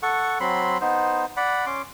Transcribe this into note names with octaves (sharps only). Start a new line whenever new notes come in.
A4 F#5 C#6
F#3 C4 B5 C6
B3 D#4 C5
D5 F#5 B5
C#4 C6 D6